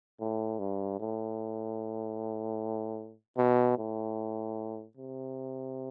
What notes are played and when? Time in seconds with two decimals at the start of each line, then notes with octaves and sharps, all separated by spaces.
0.20 A2
0.59 G2
0.99 A2
3.37 B2
3.78 A2
4.97 C3